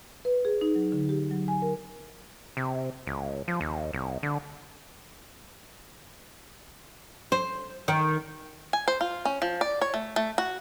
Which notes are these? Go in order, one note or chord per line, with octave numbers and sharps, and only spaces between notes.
B4
G#4
D#4
F#3
D3
G4
F#3
G#5
A#4
C3
C#2
F3
D#2
C2
D3
C5
D#3
G#5
C5
F4
C#4
F3
D5
C#5
A3
A3
F#4